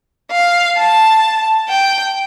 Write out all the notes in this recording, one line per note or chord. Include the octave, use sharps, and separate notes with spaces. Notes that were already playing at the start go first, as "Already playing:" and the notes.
F5
A5
G5